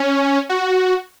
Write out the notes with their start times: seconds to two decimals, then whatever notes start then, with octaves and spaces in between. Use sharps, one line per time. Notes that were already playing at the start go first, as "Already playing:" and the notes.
Already playing: C#4
0.49 F#4